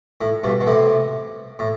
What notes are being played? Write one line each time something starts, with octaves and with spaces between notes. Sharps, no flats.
A2
G2 B2
B2
A2 C3
A2